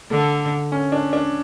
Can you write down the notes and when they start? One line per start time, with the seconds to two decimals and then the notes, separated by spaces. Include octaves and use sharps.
0.11 D3 A4
0.72 C#4
0.92 D4
1.13 D4